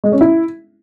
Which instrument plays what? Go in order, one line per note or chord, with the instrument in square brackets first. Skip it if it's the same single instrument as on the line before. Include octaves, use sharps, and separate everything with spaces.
[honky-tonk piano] G#3
C#4
E4